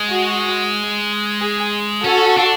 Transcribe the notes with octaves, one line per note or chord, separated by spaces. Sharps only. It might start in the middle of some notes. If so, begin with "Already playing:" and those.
Already playing: G#3
F#4
G#4
C#4 F#4 A4
D4